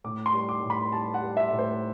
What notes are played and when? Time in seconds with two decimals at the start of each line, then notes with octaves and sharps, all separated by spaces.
0.04 A2 D6
0.26 C6
0.33 G3
0.49 D6
0.63 A2
0.70 B5
0.92 G3 A5
1.14 F#5
1.22 G3
1.37 E5
1.50 A2
1.59 C5